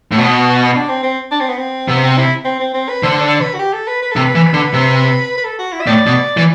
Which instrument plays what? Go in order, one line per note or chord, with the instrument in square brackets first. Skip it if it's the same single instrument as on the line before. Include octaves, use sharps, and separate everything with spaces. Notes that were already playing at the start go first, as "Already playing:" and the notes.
[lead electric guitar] A2
[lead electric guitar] B2 [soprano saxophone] F#4
[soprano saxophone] D4
C4
C4
D4
C4
B3
C4
[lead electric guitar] C3 [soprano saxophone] B3
[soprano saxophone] C4
E4
C4
C4
C4
B4
[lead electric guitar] D3 [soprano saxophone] C5
[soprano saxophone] D5
B4
F#4
G4
A4
B4
B4
[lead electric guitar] C3 [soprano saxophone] A4
[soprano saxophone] B4
[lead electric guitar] E3
D3
C3
[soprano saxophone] B4
A4
F#4
E4
E5
[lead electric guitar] A2 [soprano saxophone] D5
[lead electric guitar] B2
[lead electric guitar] E3 [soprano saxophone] D5